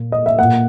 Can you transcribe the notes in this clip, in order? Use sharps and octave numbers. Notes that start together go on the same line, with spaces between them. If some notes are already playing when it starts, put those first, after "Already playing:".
Already playing: A#2 A#3
D#5
E5
A#2 A#3 F#5